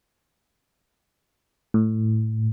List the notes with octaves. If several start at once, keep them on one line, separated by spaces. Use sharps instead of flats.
A2